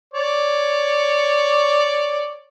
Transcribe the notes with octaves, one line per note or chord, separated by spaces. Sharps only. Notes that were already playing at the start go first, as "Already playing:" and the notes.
C#5 D5